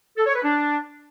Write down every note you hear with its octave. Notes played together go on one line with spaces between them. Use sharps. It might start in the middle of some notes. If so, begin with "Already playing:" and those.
A4
C#5
B4
D4